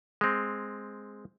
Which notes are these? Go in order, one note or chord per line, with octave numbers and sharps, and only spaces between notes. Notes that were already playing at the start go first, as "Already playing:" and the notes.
G#3 C4